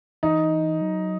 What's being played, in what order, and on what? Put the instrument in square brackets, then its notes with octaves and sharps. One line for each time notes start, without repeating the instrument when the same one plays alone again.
[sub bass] E3 [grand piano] D#4
[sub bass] F#3